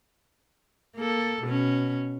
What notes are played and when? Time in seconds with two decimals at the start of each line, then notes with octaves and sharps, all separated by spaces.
0.96 A#3 A4
1.43 B2 C#4